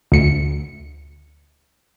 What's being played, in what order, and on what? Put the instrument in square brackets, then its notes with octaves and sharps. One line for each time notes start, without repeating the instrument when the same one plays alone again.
[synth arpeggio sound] D2 C#7